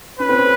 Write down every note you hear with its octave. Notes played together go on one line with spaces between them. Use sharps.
C#4 B4
C4
C#4